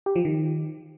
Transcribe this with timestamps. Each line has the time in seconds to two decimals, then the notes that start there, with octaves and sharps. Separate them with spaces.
0.06 G4
0.16 F3
0.25 D#3